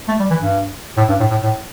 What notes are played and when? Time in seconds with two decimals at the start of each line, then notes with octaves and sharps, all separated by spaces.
0.08 A3
0.20 G3
0.30 E3
0.42 G2
0.97 A2
1.09 G2
1.20 A2
1.31 A2
1.43 A2